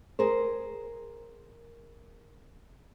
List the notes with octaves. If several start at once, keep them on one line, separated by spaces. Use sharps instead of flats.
G#4 A#4 C5